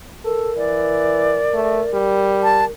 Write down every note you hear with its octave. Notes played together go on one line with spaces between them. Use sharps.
A4 A#4
E3 D5
A3
G3
A5